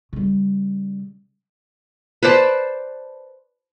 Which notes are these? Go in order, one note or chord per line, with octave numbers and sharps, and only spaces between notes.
C#3 G3
B4 C5 D5 A5